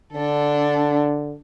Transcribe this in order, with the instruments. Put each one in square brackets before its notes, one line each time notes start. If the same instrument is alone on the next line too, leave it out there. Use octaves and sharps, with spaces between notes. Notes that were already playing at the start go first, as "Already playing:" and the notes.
[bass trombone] D3 [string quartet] D4 A4